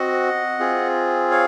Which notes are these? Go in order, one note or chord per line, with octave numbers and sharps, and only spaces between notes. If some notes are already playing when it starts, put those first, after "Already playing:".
Already playing: C4 F#4 D#5 F#5
C4 F4 G#4
C#5 F5